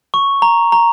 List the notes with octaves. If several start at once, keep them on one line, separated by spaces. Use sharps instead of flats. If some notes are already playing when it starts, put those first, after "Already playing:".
C#6
A#5
A#5